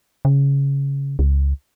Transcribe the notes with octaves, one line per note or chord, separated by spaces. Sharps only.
C#3
C#2